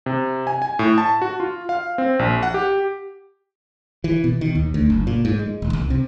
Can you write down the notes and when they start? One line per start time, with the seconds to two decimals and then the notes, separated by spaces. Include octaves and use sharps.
0.06 C3
0.47 G#5
0.62 G#5
0.79 A2
0.98 A5
1.22 F#4
1.40 F4
1.69 F5
1.98 C4
2.19 A#1
2.43 F#5
2.54 G4
4.04 E3
4.24 B2
4.41 D#3
4.55 D#2
4.74 D2
4.90 F#1
5.07 A#2
5.25 G#2
5.39 G#3
5.62 D#1
5.73 C2
5.90 C3